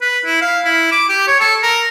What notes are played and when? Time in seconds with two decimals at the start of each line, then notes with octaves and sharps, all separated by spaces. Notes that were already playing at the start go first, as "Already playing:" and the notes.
0.01 B4
0.25 E4
0.42 F5
0.65 E4
0.92 D6
1.09 G4
1.27 C#5
1.40 A4
1.63 A#4